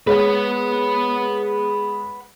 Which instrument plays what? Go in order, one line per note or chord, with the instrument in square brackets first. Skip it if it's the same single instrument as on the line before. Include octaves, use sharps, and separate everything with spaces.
[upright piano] G#3 C#5 [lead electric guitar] B4 F#5